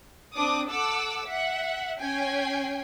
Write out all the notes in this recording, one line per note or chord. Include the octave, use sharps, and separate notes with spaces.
C4 D4 D6 D#6
A4 F#5 D6 E6
E5 F#5
C#4 G5 G#5 C7